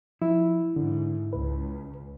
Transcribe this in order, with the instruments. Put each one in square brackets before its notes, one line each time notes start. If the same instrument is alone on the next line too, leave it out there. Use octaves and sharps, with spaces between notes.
[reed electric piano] F3 [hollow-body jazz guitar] E4
[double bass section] G#2 [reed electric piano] D3
[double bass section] C#2 [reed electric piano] B4